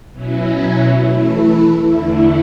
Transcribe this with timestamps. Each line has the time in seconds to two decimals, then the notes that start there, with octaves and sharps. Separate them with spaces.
0.12 B2 F#3 C#4 E4
0.97 E3 A3 E4
1.82 E2 D3 A3 E4